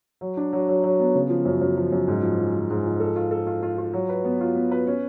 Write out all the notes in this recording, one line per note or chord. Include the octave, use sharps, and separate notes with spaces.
F#3
D4
F#3
F#3
F#3
B3
C#3
F3
F#2
F#2
F3
F#2
G#2
F3
F3
F3
G#2
F3
A4
F4
A4
F4
F4
F4
F#3
B4
B3
F4
B3
B4
C#4